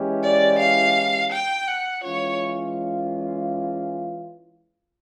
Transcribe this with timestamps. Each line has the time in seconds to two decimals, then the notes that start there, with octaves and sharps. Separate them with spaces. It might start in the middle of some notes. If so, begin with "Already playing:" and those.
Already playing: E3 G#3 C#4 E4 G4
0.23 D5
0.59 F5
1.32 G5
1.68 F#5
2.03 E3 G#3 C#4 F4 C#5